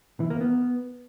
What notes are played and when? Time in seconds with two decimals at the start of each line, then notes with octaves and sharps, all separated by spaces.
0.20 E3
0.30 A#3
0.41 B3